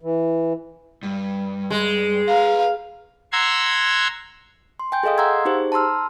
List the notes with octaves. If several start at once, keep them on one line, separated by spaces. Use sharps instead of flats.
E3
G2
G#3
B4 F5 A#5
F#5 A#5 C6 E6 G#6
C6
G5 G#5 G6
G#4 A4 D#5 F5 D#6
F5 F#5 A#5 C6 E6 G#6
D#4 G4 G#4 C5
A5 A#5 C6 E6 F6